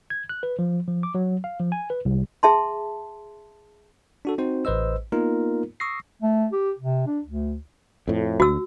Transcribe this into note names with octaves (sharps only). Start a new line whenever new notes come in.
G#6
F#6
B4
F3
F3
D6
F#3
F5
F3
G#5
B4
C2
G#4 E5 A5 C6
D4 F#4 A4
C4 D#4 F#4 C5
A1 B4 C5 D#5 E6
A#3 B3 D#4 F4 A#4
C#6 D#6 E6 A#6 C7
A3
G4
C3
D4
D2
F2 A2
D2 F#4 E6